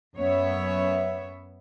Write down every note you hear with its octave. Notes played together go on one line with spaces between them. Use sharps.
F#2 B3 C#5 E5